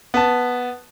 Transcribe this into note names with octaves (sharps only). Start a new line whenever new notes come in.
B3 A5